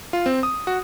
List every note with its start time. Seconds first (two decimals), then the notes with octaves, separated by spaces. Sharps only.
0.13 F4
0.26 C4
0.43 D#6
0.67 F#4